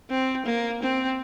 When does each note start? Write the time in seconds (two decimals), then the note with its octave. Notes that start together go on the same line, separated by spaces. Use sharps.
0.10 C4
0.46 A#3
0.82 C4